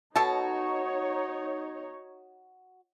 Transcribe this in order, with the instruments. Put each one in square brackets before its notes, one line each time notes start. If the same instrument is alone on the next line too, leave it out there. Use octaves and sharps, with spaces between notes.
[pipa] B2 A4 A5 [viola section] D#4 C#5 [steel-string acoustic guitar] F#4